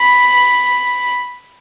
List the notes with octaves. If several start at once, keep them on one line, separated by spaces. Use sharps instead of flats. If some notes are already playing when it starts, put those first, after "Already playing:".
Already playing: B5